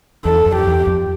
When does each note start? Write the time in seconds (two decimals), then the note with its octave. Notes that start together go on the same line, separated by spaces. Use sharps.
0.25 E2 A4
0.46 F2
0.56 G4
0.67 E2
0.87 F2